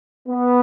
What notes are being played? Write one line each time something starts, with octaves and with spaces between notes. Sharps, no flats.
B3